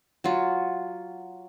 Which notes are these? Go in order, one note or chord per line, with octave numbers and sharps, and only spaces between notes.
F#3 F4